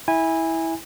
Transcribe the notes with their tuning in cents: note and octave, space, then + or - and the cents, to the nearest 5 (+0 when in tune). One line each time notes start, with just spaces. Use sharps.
E4 -15 G#5 -20